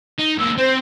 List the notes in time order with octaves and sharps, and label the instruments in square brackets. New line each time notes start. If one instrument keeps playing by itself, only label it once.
[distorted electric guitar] D#4
[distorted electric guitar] C#2 A#3 [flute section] E6
[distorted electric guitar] C4 [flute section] C5